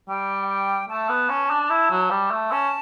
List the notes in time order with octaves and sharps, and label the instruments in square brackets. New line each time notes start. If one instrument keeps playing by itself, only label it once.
[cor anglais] G3 [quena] G5
[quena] G5
[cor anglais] A3 [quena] A5
[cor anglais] B3
C#4
D4
E4
F#3
G3
A3
[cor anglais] C#4 [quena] A5